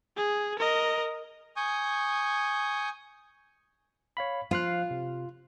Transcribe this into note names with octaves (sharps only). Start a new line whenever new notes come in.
G#4
A#4 D#5
G#5 C#6 D#6 G6
C#5 F5 B5
F3 F4 F5 F#6
C3